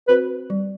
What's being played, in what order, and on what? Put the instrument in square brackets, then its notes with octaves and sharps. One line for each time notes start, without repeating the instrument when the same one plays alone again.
[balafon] C4 F#4 C5 [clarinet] B4
[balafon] G3